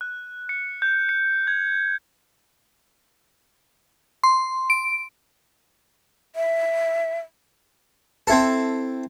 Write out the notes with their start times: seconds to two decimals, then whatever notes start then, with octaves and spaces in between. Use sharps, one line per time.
0.01 F#6
0.49 C#7
0.82 G6
1.09 C#7
1.47 G#6
4.24 C6
4.70 D7
6.36 E5
8.27 C4 E4 A4